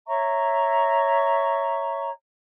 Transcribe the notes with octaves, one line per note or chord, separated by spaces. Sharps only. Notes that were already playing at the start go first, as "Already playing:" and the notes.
C#5 E5 A#5 C#6